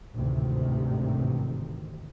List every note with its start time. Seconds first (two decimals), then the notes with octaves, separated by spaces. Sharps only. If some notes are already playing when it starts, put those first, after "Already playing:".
0.14 A1 D2 G#2 C3 D#3